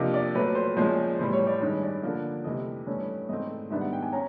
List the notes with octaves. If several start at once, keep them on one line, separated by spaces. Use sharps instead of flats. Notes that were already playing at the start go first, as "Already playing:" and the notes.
Already playing: C3 F3 A#3 D4 D#5
D5
A#2 F#3 A3 B4
C5
A#2 F3 G#3 C#4 C5
A2 E3 G3 C5
C#5
D5
G2 D#3 G#3 C#4
D5
D3 F3 A#3
C3 E3 A3 D#5
G2 E3 A3 C#4
G#2 E3 A3 C4 D#5
G#2 D#3 G3 B3 D4 E5
F#5
G5
G#5
C#4 A#5